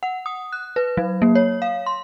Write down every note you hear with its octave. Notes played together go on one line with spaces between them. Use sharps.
F#5
D#6
F#6
B4
F#3
A#3
C#5
F5
C6